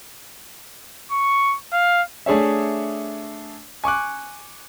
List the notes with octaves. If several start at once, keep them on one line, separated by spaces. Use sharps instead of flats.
C#6
F5
A3 D4 G#4 C#5 E5
G#5 C#6 D6 F#6